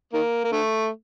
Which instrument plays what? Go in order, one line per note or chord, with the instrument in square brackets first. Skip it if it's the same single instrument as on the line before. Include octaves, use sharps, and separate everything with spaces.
[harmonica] D#3 A#3
A#3
D3 A3